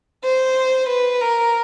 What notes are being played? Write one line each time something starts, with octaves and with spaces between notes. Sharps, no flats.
C5
B4
A#4